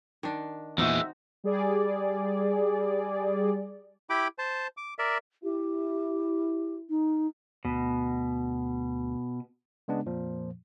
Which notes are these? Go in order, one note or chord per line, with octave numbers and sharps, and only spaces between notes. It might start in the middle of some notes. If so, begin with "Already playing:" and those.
D#3 D4
E2 A#2 E3 G#3 C4 D#4 F#4 E5
G3 G#4 D5
E4 G4 G5 B5 D6
C5 A5
D6
A#4 D5 E5
E4 G4
D#4
D2 B2
C#3 G#3 B3 D4
F2 A#2 F3